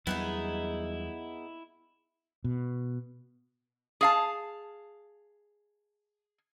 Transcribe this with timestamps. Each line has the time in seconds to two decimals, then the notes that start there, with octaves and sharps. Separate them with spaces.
0.07 E2 F#3 G3 B3 D#4 E4 G#4
2.44 B2
4.01 G#4 F5 A5